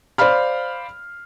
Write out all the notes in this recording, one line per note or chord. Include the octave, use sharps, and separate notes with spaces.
C5 D5 F5 B5 F6